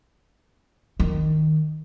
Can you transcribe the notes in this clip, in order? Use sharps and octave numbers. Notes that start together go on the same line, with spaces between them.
D#3